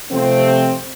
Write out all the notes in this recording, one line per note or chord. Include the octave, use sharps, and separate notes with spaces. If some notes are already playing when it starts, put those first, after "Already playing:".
C3 F3 A3 C4